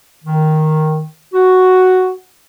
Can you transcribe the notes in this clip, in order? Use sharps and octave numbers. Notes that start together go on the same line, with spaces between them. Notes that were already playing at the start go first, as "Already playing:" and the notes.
D#3
F#4